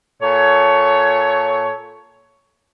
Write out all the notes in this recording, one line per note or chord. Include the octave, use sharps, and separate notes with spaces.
A#2 A4 C#5